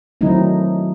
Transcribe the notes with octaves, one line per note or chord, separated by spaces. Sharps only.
D#3 F#3 A3 C4 D#4 E4